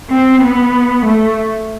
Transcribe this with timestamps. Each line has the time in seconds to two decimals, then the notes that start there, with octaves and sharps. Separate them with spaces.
0.10 C4
0.41 B3
1.06 A3